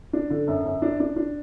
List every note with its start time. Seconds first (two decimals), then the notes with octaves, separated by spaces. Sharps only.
0.13 D4
0.30 D3
0.47 F#2
0.65 F#2
0.82 D4
1.00 D4
1.16 D4